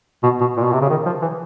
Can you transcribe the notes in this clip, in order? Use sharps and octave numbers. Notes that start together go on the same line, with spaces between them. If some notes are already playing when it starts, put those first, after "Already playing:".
B2
B2
A#2
B2
C3
C#3
D#3
F3
E3